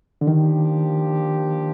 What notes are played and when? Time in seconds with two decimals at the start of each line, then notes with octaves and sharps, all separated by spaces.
0.21 D3
0.27 D#3 F3 A#3 D4 G4